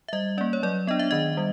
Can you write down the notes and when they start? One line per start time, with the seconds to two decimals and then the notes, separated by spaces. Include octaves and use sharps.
0.08 E5
0.13 G3 D#5
0.38 A#3 C#4 D5
0.53 C#5
0.63 F#3 D5
0.87 B3 D4 D#5
0.99 E5
1.11 D#3 D#5
1.37 G3